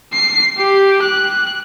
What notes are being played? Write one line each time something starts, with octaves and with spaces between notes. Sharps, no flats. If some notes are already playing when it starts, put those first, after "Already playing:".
C7
G4
F#6